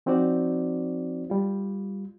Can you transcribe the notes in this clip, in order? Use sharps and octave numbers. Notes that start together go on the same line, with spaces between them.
F3 C4 D#4 F#4 C5 D5
G3 F4